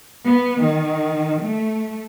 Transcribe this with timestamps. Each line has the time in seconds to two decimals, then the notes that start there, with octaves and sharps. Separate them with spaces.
0.24 B3
0.61 D#3
1.41 A3